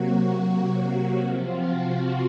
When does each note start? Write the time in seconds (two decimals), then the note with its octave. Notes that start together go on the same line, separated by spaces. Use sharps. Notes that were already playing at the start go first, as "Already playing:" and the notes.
Already playing: C3 F#3 A#3 F#4
0.40 F#4
1.22 C3 F3 C4 F4
1.65 F#4